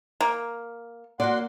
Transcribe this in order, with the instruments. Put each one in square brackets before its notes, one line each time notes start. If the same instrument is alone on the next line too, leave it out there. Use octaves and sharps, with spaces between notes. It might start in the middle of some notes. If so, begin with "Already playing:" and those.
[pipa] A#3
[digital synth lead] A#3 [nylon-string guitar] F#4 D5 [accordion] F#5 C6